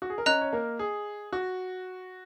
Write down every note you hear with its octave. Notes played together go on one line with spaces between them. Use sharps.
F#4
G#4
A#4
C#4 C#5 D#5 A#5 F#6
C#5
A#3 A#4
G#4
F#4